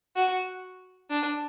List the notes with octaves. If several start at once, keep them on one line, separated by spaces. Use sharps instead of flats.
F#4
D4